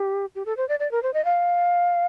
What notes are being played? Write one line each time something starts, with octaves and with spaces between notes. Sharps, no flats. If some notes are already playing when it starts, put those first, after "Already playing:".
Already playing: G4
G4
A4
C5
D5
D5
A#4
C5
D#5
F5